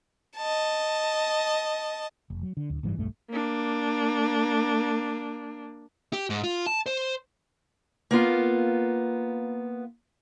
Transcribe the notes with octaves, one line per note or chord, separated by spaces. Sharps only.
D#5 A5
F1
F#3
D3
D1 D2
F#1 G#2 E3 G3
E1 B1 G2 A3
A#3 D4
G4
G#2
F4
A5
C5
A#3 B3 F4 F5